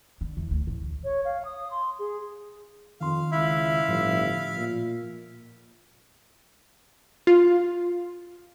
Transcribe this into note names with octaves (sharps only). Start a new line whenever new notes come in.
D3
E2
D2
A1
C#5
F5
D#6
C6
G#4
F2 D#3 F5 C6
C#2 E4 E5 F5
G1 A2 F3
A#2
F4